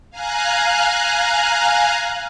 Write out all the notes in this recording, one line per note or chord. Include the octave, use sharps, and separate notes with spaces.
F5 G#5 A#5 F#6